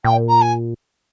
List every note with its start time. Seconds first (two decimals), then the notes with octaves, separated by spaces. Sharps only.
0.04 A#2 G5
0.29 A#5
0.42 G#5